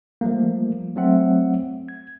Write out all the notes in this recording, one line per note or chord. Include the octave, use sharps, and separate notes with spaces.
F3 G3 A3 A#3
F#3 A3 C4 E5 F#5
G#6